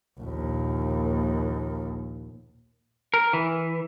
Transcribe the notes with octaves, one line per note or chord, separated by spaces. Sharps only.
A#1 D#2
A#4
E3